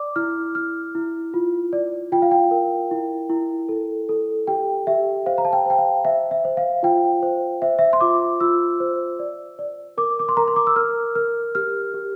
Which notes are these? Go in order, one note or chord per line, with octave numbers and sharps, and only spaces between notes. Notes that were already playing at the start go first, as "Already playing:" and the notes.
Already playing: D5 D6
E4 F6
E4 F6
E4
F4
D5
F4 G5
F5
G5
A#4
E4
E4
A4
A4
G4 G5
G4 E5
C5 F5
A#5
A5
G5
C5 G5
F5
C5 E5
E5
C5
F5
F4 G5
C5
C5 E5
E5
C6
F4 D6
F4 E6
C5
D5
D5
A#4 D6
D6
C6
A#4 A#5
C6
D6
E6
A#4 F6
A#4 F6
G4 F6
G4